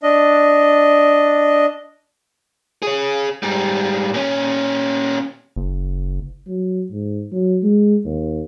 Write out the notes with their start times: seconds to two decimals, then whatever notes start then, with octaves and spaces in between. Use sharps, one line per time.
0.03 D4 D#5
2.82 G#4 C#5
3.43 G#2 G3
4.14 A#2 C#4
5.56 F#1
6.48 F#3
6.92 G#2
7.32 F#3
7.63 G#3
8.05 D#2